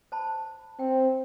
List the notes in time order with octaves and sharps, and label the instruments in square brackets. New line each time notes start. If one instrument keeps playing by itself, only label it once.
[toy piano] C5 A5 B5
[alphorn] C4 [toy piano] G5